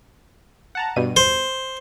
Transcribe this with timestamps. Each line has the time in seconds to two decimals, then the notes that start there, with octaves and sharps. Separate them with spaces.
0.75 F#5 A5 A#5
0.96 G2 B2 D#7
1.17 C5